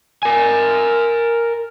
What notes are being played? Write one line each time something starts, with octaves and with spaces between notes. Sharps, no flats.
A#4 G#5